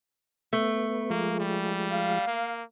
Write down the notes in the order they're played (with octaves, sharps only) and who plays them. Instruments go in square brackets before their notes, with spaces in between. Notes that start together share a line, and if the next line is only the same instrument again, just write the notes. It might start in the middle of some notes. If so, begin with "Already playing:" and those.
[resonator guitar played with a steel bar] A3 [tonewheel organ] B3
[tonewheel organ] F3 G#3 [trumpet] A#3
[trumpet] G3
[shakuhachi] F5
[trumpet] A#3